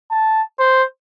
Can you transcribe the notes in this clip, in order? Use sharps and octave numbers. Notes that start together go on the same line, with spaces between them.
A5
C5